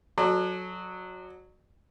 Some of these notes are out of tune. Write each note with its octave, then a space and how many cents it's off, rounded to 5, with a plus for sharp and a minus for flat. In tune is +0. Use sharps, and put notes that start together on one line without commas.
F#3 -10 A4 -20 D5 +45